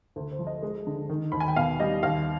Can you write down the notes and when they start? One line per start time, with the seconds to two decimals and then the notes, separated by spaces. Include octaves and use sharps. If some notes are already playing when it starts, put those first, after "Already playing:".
0.16 D2
0.32 C5
0.39 F3
0.47 D#5
0.63 G#3
0.87 D3
1.09 D#3
1.32 D#2 B5
1.40 G#5
1.48 G5
1.56 B2 F5
1.80 G3 D#5
2.03 D#2 F5